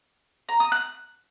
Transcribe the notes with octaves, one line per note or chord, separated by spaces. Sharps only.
A#5
D#6
F#6